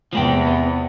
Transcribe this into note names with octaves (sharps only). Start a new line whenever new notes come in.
E2 C3 F3 G#3 G5
B3